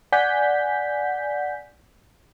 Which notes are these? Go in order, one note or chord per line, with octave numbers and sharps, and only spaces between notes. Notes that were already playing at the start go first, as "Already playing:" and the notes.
D5 F#5 G#5 G6 B6